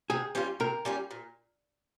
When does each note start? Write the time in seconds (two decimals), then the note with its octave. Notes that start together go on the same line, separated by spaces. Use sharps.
0.10 C3 G#4
0.35 G3 C#4 F4
0.60 C3 A#4
0.85 G3 C#4 F4
1.11 A#2